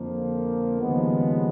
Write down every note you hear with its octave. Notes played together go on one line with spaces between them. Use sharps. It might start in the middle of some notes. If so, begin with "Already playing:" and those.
Already playing: F2 D3 F3 A#3
D#2 C#3 F3 G#3 B3